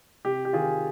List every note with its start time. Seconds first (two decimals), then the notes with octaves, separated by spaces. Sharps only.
0.25 C3 G4
0.45 G4
0.53 D#3 F4 G#4